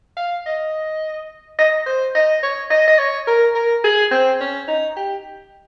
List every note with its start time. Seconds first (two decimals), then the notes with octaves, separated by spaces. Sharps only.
0.17 F5
0.46 D#5
1.58 D#5
1.86 C5
2.15 D#5
2.43 C#5
2.70 D#5
2.87 D#5
2.98 C#5
3.27 A#4
3.55 A#4
3.84 G#4
4.11 C4
4.41 C#4
4.68 D#4
4.96 G4